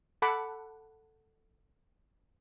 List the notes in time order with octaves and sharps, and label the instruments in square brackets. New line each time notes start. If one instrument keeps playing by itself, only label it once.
[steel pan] A4 F#5 A5 B5 D6